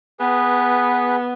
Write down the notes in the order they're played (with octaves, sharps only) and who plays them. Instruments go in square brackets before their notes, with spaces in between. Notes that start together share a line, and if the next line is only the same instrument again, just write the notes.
[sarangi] B3 [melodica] G#4 B4